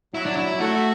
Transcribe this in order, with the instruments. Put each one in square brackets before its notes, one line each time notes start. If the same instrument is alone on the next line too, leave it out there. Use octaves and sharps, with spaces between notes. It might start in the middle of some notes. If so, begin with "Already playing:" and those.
[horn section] F#3 [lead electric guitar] E4
[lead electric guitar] D4
E4
[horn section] A3 [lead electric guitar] F#4